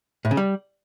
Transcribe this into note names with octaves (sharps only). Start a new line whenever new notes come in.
A2
C#3
G3